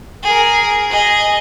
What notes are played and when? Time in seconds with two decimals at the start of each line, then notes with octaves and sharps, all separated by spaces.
0.23 G#4 A#4
0.90 G#4 D#5